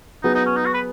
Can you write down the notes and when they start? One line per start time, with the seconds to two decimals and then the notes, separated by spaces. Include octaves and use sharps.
0.23 F#3 B3 D#4 G#4
0.35 D#4
0.46 C#4
0.57 D#4
0.66 F#4
0.74 B4